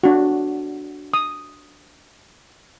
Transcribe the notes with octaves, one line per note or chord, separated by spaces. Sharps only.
D4 F#4
D#6